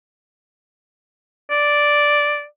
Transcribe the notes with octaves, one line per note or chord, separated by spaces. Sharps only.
D5